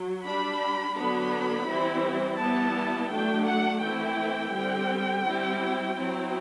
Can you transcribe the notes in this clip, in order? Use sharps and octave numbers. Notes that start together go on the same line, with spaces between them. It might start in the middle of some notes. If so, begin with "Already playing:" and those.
Already playing: F#3
G3 D4 B5
D3 F#3 B3 D4 B5
E3 G3 C4 E4
E3 G3 B3 E4 A5
F#3 A3 D4 G5
F#5
E3 A3 C4 E4 G5
D3 G3 C4
G3 C4 E4
F#3 C4 E4